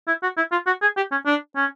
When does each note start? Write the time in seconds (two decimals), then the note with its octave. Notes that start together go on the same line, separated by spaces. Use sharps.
0.08 E4
0.23 F#4
0.37 E4
0.52 F4
0.67 F#4
0.82 G#4
0.97 G4
1.12 C#4
1.26 D4
1.56 C#4